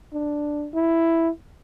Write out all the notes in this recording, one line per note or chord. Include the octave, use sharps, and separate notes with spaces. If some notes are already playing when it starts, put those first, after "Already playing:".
D4
E4